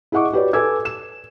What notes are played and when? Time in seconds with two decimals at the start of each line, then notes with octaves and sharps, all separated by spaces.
0.12 E4 G#4 D#5 F#5 C#6 D6
0.32 F#4 G4 B4 C#5 D5
0.53 A4 B4 G#5 D6 E6 G#6
0.85 E7